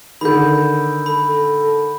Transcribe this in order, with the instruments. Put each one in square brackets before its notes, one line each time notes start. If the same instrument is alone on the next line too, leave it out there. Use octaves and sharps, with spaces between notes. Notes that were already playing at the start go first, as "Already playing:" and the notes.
[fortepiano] D3 D#3 [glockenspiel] B5 G6
[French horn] A4 [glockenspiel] B5